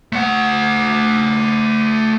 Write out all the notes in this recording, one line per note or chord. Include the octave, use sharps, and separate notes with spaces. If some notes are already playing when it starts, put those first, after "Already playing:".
A3 F#5